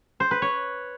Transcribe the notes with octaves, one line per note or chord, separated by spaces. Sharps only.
C5
B4
C#5